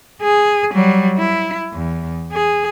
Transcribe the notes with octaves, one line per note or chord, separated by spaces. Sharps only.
G#4
F#3 G3
E4
E2
G#4